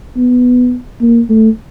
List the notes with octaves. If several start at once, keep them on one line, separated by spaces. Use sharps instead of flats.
B3
A#3
A3